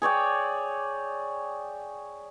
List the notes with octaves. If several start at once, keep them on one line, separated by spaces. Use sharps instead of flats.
G#4 C#5 D5 G5